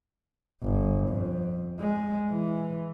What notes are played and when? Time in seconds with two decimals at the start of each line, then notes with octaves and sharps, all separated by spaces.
0.63 G1
1.08 F2
1.80 G#3
2.31 E3